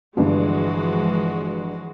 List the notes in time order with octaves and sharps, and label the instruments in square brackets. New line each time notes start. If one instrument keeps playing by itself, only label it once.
[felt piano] G1 G2 [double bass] E3 [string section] F3 G#3 F#4